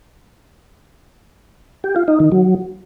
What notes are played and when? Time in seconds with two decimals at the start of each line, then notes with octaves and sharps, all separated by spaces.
1.84 G4
1.96 F4
2.08 D#4
2.20 D#3
2.32 F#3